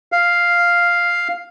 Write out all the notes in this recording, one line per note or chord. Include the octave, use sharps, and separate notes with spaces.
F5